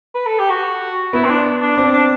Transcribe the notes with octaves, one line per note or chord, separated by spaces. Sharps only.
B4
A4
G4
F#4
B3 E4
C4
D4
D4
C4 D4
D4